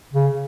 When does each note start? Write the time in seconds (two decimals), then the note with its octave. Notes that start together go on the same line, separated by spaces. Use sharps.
0.13 C#3